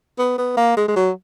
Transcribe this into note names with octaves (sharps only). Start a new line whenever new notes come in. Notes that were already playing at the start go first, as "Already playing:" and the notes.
B3
B3
A#3
G#3
G#3
F#3